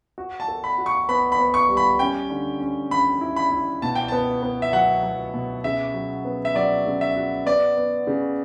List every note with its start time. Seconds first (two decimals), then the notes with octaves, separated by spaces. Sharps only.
0.18 F#4
0.40 A5
0.48 A4
0.64 B5
0.78 F#4
0.86 C#6
1.09 B3 B5
1.32 B5
1.39 B3
1.54 C#6
1.69 G3
1.77 B5
1.99 C#4 G5
2.30 D3
2.61 C#4
2.91 C#4 B5
3.21 E4
3.36 B5
3.51 E4
3.82 B2 A5
3.95 G5
4.08 B3 A5
4.43 B3
4.62 E5
4.73 F#3 F#5
5.03 F#3
5.34 B2
5.64 C#3 E5
5.94 F#3
6.25 B3
6.45 E5
6.55 F#3 D5
6.86 C#3
7.01 E5
7.16 F#4
7.46 B3 D5
7.77 B3
8.07 C#3